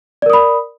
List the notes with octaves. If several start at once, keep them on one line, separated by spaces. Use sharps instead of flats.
A#4 D5 B5 D#6